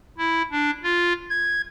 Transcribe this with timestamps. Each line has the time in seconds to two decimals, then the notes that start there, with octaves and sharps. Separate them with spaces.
0.18 E4
0.51 D4
0.83 F4
1.30 G#6